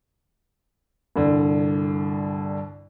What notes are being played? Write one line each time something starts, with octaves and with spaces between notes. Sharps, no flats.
C2 G2 D3